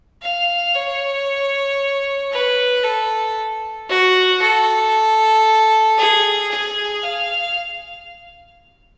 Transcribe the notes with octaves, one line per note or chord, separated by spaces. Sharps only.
F5
C#5
B4
A4
F#4
A4
G#4
G#4
F5